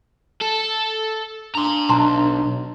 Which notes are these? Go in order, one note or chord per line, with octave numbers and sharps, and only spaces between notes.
A4
D4 A#5 C6
B1 A5 A#5 C6